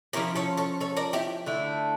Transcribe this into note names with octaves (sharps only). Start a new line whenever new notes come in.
F3 C#4 E4 G4 A#4
A4 C#5
A4 C#5
A4 C#5
A#4 D5
E4 G4
D3 A3 E4